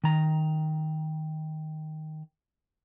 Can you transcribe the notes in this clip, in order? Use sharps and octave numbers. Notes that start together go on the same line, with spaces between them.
D#3 A#5